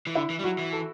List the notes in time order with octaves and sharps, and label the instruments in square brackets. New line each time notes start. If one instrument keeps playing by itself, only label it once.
[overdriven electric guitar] E3
[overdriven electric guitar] D3 [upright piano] E4
[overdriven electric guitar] E3
G3
[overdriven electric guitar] F#3 [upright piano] F#4
[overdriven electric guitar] E3
[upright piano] A4